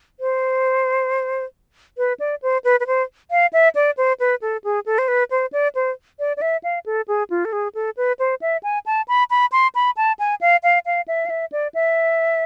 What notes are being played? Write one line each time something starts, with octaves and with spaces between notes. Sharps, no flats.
C5
B4
D5
C5
B4
B4
C5
F5
E5
D5
C5
B4
A4
G#4
A4
C5
B4
C5
D5
C5
D5
D5
E5
F5
A4
G#4
F4
A4
G#4
A4
B4
C5
E5
G#5
A5
B5
B5
C6
B5
A5
G#5
F5
F5
F5
E5
F5
E5
D5
E5